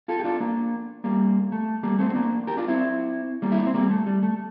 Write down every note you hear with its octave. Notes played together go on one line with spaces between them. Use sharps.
F4 A4
G4
D4 F4
A#3 D4
G3 A#3
A3
G3 A#3
A3 C4
C4
A#3 D4
G4 A#4
D4 F4
C4 E4
G3 A#3
E4
D4
C4
G3 A#3
A3
G3
A3